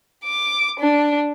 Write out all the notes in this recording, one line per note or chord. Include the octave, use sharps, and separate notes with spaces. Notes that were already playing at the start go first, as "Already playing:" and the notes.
D6
D4